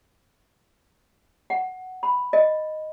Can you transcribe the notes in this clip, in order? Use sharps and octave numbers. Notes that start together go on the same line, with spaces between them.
F#5
B5
D#5